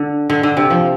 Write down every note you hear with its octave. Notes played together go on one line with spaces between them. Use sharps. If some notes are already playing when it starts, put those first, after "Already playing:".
Already playing: D3
D3
D3
C3
F3